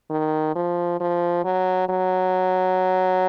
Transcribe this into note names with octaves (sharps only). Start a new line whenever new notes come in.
D#3
F3
F3
F#3
F#3